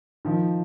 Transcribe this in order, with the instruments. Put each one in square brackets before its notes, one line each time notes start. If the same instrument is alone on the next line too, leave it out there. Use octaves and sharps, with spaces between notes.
[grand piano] D#3 F3